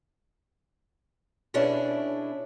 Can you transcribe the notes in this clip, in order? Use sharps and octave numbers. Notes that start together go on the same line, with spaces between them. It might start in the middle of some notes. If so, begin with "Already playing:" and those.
B2 C#4 D4 E4 G#4 A5